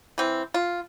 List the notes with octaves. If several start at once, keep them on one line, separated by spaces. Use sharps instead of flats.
E3 C4
F4